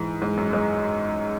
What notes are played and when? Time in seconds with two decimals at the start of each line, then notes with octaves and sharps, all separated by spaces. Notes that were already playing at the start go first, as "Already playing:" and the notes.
Already playing: G#2 E3 G#3
0.22 G#2 G#3
0.37 F#2
0.53 G#3